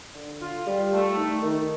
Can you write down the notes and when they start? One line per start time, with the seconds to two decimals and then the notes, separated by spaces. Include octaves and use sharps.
0.16 D3
0.41 F4
0.67 G3
0.93 A3
1.17 D#3
1.43 D#3